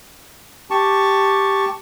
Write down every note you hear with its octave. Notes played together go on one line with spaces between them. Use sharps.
G4 A5 C#6